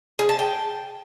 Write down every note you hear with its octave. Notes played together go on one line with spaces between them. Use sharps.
G#4
A5
G5